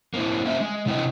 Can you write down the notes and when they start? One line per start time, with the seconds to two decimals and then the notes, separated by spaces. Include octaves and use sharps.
0.14 A#3 C4 E4
0.45 A#3 C#4 C5 E5
0.60 G#3
0.86 C3 C4 E4 G#4 D#5 G5